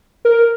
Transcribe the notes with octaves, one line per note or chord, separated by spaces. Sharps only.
A#4